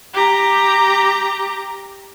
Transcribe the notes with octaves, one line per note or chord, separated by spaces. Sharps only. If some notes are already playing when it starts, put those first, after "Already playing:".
G4 A#5